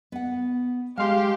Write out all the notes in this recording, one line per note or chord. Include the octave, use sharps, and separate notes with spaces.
B3 F#5
G#3 G4 F5 C6